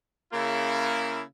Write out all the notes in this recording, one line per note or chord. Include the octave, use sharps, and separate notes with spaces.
C#3 A#3 E4